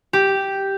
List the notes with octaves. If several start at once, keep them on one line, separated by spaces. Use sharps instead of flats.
G4